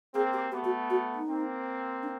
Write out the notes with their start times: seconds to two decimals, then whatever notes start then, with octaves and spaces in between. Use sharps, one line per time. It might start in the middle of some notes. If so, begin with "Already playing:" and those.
0.13 A#3 C4 G#4
0.33 G4
0.51 A3 B3 G4
0.65 F#4
0.90 F#4
1.15 D#4
1.27 A#3 C4
2.03 D4